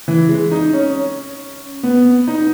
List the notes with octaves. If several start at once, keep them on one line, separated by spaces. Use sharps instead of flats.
E3
G#3
D#4
C#4
C#4
B3
D#4